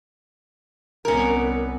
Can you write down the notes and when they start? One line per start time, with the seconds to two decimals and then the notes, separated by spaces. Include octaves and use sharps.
1.05 C2 B3 C#4 A#4